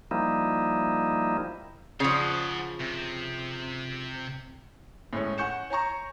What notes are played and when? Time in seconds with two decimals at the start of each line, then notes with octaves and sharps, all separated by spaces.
0.11 F3 G3 A#3 D#4 E4
2.00 C#3 F3 C5 F#5
2.80 C3
5.13 A2 G#3 C#4 C#5
5.38 F#5 G#5 C#6 G6 C#7 E7
5.70 C#5 G#5 A#5 C#6